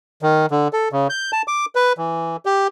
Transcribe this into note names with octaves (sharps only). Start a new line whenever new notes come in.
D#3
D3
A4
C#3
G6
A5
D6
B4
E3
G4